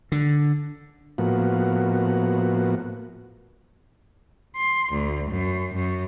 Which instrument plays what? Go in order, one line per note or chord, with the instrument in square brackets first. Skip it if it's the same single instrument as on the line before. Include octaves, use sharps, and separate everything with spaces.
[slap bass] D3
[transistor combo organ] A2 F3 A#3 B3 F#4
[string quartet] C6
D2
F#2
F#2